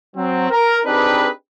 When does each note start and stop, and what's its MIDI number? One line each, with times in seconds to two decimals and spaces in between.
0.16 0.50 54
0.16 0.50 60
0.50 0.81 70
0.85 1.29 60
0.85 1.29 62
0.85 1.29 63
0.85 1.29 67
0.85 1.29 68
0.85 1.29 71